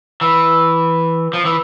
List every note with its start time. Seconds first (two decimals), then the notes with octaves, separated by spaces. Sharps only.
0.21 E3
1.33 F3
1.45 E3